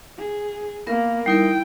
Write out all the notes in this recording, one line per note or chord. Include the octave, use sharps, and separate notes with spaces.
G#4
A#3 B3 A#4
G3 D#4 E4 A#4 G5